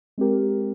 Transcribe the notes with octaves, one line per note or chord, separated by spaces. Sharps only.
G#3 C4 G4 A#4